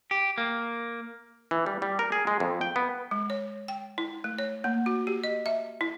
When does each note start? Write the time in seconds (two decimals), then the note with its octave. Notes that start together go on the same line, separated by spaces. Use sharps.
0.11 G4
0.38 A#3
1.51 E3
1.66 G3
1.82 G3
1.99 A#4
2.12 G#4
2.27 G#3
2.40 F2
2.61 G5
2.76 B3
3.11 G#3
3.30 C#5
3.68 G5
3.98 E4
4.24 A3
4.39 C#5
4.64 A#3
4.86 F#4
5.07 G4
5.24 D#5
5.46 E5
5.81 E4